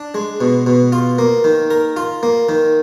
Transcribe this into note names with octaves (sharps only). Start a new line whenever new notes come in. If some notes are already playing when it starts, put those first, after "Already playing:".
Already playing: D4
G#3
B2
B2
F4
A#3
D#3
A#4
F4
A#3
D#3